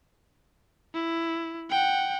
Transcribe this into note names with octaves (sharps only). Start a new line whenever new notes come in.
E4
F#5 G5